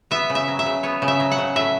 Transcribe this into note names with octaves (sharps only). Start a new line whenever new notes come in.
B3 E5
C#3
E5
F#3
E5
C#3
B3 C#5
C#3
E5
F#3
F#5
C#3
A2 E5